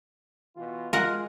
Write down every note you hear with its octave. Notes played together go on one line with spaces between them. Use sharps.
B2 E3 F4
G#3 F4 A#4 F#5